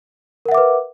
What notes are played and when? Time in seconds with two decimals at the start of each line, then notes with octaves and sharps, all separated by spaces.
0.46 A#4
0.49 F#5
0.52 E5
0.55 D6
0.58 B4